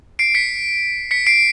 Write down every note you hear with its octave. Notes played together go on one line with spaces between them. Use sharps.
C7 D7
B6 C#7
B6 C#7
C7 D7